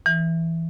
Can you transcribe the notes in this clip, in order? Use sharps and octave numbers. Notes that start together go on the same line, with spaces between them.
E3